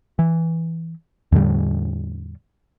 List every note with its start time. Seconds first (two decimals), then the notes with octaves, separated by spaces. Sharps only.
0.19 E3
1.32 E2 A2 D3 G3